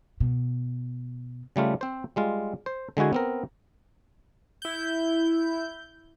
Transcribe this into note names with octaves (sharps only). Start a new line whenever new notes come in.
B2
C#3 G3 A3 F4
C4 C5
G3 G#3 F4
C5
D3 G#3 E4 F#4 G#5
B3 C4 A#4
E4 G6